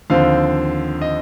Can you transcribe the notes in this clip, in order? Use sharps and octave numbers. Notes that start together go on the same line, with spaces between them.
D#2 D3 F3 C4 F5
D#5